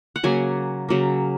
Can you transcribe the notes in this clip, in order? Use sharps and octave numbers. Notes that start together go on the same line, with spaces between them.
F#5
C#3 F#3 A#3 G#5
C#3 F#3 A#3